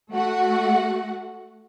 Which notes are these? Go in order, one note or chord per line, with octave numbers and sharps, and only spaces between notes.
A3 F#4 F#5